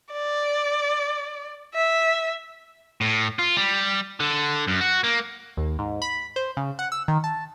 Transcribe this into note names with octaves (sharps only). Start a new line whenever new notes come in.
D5
E5
A2
F4
G3
D3
F#2
F#4
A#3
D#2
G#2
B5
C5
C#3
F#5
E6
D#3
A5